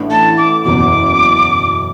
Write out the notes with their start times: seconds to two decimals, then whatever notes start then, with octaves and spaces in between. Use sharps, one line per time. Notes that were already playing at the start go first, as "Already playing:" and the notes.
Already playing: A1 A2 E3 D4
0.11 A5
0.38 D6
0.64 F#1 E2 B2 D6